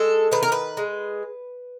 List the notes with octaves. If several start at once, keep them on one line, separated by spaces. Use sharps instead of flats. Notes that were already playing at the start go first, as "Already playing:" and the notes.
Already playing: G#3 A4
D#3 B4
A#4
B4
G#3